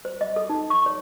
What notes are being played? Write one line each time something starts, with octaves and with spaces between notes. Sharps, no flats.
C5
D#5
A4
D#4
C#6
C#5